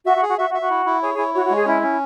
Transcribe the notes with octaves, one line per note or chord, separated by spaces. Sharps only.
F#4 E5
F#4
G#4
F#4
F#4 E5
F#4
E5
F#4
E4
E4
G#4 C#5
G#4
E4
F#4 C#5
F#4
G#3
G#4
C#4 E4
C#4